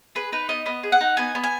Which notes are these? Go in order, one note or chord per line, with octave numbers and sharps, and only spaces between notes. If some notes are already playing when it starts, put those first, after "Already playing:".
G#4 B4
D#4 B4
B3 D#5
B3 D#5
G#4
F#5
D#4
B3 G#5
B3
G#5